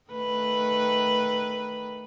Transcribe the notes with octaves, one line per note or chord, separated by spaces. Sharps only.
D#3 A3 B4